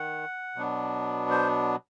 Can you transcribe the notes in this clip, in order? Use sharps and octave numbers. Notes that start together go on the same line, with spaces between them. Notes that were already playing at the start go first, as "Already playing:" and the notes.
Already playing: D#3 F#5
B2 F#3 B3 D4
C5